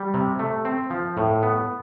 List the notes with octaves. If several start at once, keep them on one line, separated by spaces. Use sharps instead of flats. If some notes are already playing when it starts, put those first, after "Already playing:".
Already playing: G3
C3
A3
C4
F3
A2
B3